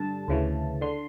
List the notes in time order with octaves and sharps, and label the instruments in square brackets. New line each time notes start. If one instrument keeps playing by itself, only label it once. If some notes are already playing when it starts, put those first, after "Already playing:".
Already playing: [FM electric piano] G2 D3 A5
D2 C#3 E3
D3 C6